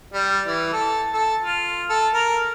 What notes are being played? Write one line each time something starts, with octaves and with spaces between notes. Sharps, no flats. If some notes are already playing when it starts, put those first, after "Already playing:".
G3
E3
A4
A4
F4
A4
A#4